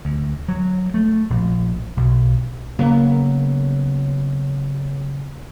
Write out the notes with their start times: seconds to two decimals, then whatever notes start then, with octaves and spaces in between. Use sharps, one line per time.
0.05 D2
0.48 F#3
0.94 A3
1.30 A#1
1.97 B1
2.79 C#3 F#3 A#3 B3